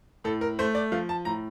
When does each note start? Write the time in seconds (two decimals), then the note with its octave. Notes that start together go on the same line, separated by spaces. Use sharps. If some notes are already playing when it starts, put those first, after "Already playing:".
0.24 A2 A4
0.41 A#4
0.59 A3 C5
0.75 D5
0.92 F3 F5
1.09 A5
1.25 A2 A#5